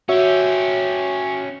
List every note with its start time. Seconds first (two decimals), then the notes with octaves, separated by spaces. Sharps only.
0.09 C#4 F#4 G4 C#5 E5